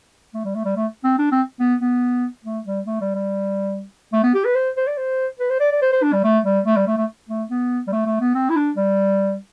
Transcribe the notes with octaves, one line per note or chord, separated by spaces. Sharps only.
A3
G3
A3
G3
A3
C4
D4
C4
B3
B3
A3
G3
A3
G3
G3
A3
B3
G4
B4
C5
C5
D5
C5
B4
C5
D5
D5
C5
C5
D4
G3
A3
G3
A3
G3
A3
A3
A3
B3
G3
A3
A3
B3
C4
E4
D4
G3